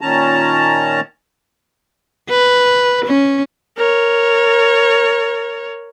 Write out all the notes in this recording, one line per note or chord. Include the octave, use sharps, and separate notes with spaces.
A#2 D#3 C#4 A5 A#5
B4
C#4
A#4 C#5